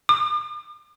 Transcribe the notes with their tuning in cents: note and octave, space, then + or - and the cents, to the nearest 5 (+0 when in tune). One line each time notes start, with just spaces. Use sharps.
D6 +45